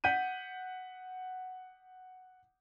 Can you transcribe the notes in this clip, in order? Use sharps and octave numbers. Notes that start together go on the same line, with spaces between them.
F#5 G6 B6 D#7